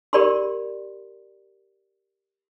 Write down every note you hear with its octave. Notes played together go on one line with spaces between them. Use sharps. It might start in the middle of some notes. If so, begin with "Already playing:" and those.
G4 A#4 D5 B5 C6